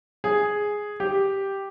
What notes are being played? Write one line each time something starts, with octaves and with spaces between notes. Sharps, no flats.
G#4
G4